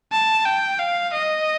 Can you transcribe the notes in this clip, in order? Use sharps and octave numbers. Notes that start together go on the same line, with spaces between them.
A5
G5
F5
D#5